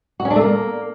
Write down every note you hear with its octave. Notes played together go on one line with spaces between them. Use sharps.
F#4
C#4
D4
A3
A#3